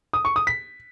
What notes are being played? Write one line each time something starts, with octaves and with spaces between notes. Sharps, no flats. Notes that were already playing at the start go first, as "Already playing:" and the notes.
D#6
C#6
D#6
B6